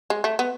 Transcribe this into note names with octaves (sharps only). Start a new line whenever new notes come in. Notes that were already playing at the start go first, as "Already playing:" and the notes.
G#3
A3
B3